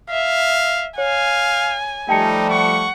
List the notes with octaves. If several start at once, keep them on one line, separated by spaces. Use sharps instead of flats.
E5 F5
C#5 F5 G#5
F3 G3 A3 D#4 G5 A5 C#7
F#5 C#6